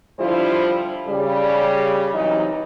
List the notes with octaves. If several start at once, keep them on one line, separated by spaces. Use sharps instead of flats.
D3 F3 G3 E4 F4 C5
C#3 G3
C3 E3 F#3 D#4